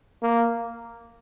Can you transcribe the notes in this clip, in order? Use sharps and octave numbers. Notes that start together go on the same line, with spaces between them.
A#3